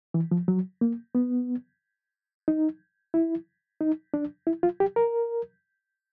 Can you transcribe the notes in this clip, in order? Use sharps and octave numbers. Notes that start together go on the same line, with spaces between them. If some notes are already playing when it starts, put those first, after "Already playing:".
E3
F3
F#3
A#3
B3
D#4
E4
D#4
D4
E4
F4
G4
A#4